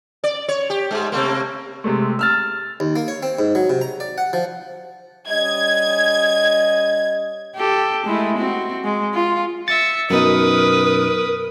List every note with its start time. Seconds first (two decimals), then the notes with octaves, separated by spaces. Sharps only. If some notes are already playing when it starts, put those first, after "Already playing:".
0.24 D5
0.48 C#5
0.70 G4
0.91 G#2 G#3
1.12 C3 A3 A#3
1.84 C3 G#3 A3
2.19 E6 F6 A6
2.80 D#2
2.96 A#3
3.08 C#5
3.23 C4
3.39 G#2
3.55 F#3
3.70 C3
3.81 A#5
4.00 D5
4.18 F#5
4.33 F3
5.28 G3 C#4 D#5 G#6
7.55 G4 A4
8.05 G#3 A3 E4
8.38 C4 F#4
8.84 G#3
9.14 F4
9.68 E5 A6 C#7
10.10 F#2 B2 D#4 A#4 B4 D#6